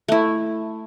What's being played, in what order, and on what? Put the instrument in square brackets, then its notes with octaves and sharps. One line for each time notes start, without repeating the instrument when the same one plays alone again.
[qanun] A3 E4